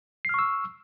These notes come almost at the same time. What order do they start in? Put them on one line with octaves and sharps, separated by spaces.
C7 F6 C#6 E6